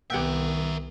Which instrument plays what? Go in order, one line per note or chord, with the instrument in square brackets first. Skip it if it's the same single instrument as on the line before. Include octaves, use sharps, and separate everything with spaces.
[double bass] C2 B3 [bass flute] D#3 [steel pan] G4 F#5 G5 [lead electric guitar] A#4 E5